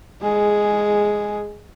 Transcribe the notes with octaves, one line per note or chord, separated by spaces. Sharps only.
G#3 G#4